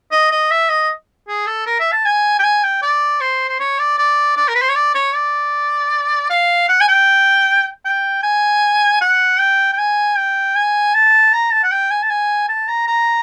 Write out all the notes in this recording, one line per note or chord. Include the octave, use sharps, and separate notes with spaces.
D#5
D#5
E5
D#5
G#4
A4
A#4
E5
A5
G#5
G5
G#5
G5
D5
C5
C5
C#5
D5
D5
D5
A#4
B4
C5
C#5
D5
C#5
D5
F5
F#5
G#5
G5
G5
G#5
F#5
G5
G5
G#5
G5
G#5
A5
A#5
A5
F#5
G5
G#5
A5
G#5
A5
A#5
A#5